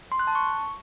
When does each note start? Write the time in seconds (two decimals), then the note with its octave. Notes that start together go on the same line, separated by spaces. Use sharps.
0.12 C6
0.19 F#6
0.27 A5
0.35 C#6